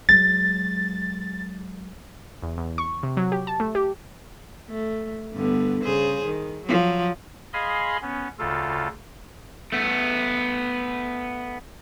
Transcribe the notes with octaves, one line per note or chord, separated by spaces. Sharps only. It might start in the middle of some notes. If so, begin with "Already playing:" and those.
F#3 G#3 A6
E2
E2
C#6
C3
F#3
G4
A5
A3
G4
A3
G2 D3 B3
C#3 G#4 C5
D#3
F3 F#3
G#4 D#5 F5 G#5 B5 C6
B3 C#4
D2 C#3 F4 A4
A3 B3